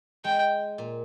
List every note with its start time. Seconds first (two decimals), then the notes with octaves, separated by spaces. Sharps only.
0.24 G#3 G5
0.78 A#2